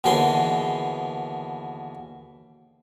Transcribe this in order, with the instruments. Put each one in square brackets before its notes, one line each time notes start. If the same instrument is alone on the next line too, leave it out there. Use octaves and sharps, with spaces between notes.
[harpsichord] D#2 B2 D3 E3 G#4 C6